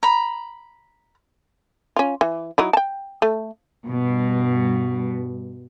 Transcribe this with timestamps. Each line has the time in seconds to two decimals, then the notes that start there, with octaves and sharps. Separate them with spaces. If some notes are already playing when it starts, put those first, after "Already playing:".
0.03 A#5 B5
1.96 C#4 F4
2.21 E3
2.58 F#3 D#4 E4
2.73 G5 A5
3.22 A3
3.87 G2 B2